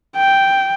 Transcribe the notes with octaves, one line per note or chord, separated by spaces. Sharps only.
G5